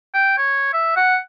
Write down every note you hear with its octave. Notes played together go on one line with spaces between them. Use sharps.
G5
C#5
E5
F#5